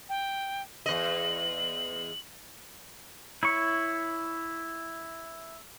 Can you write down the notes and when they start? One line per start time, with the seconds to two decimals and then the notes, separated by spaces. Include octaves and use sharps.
0.09 G5
0.86 E2 D#5 F#7
3.43 E4 C#5 C#6